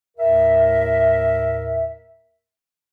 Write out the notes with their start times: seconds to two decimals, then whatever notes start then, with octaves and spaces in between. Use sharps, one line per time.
0.18 D#2 A2 A#4 E5